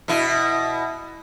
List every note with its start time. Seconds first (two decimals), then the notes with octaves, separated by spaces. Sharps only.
0.08 B2 E4